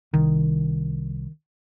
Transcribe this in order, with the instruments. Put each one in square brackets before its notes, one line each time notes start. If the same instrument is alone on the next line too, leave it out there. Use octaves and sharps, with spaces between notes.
[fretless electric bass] C2 [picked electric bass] D#3